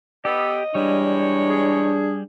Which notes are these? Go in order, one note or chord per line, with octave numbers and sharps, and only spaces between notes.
B3 G4 A4 D#5
E3 G3 G#3 D4 C#5
G#4